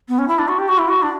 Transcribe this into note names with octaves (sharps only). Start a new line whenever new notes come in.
B3
C#4
E4
D4
F#4
G4
F#4
E4
F#4
D4